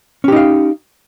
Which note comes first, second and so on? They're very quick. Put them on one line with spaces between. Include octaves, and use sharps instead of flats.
C#4 G4 D#4 F5